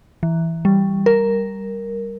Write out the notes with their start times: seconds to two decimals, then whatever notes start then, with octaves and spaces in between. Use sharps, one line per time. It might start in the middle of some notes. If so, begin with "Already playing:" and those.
0.23 E3
0.65 G3
1.06 A#4